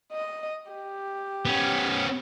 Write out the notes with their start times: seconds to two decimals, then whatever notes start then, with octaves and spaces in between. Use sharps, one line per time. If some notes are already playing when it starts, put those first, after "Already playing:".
0.13 D#5
0.71 G4
1.45 B3 C#4